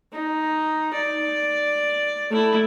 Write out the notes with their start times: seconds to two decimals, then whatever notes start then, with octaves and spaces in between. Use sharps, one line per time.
0.12 D#4
0.93 D5
2.30 A3 E4